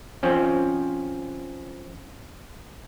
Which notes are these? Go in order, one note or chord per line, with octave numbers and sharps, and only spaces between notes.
F3 C4 C#4